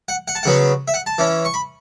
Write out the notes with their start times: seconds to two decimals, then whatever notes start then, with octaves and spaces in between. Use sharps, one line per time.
0.08 F#5
0.28 F#5
0.35 A5
0.43 C#3 F#3 B3 F#5
0.88 E5
0.94 F#5
1.06 A5
1.18 E3 C#4
1.45 C#6
1.54 B5